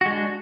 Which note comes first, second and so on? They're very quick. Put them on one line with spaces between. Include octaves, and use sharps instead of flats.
F#4 G#3 D4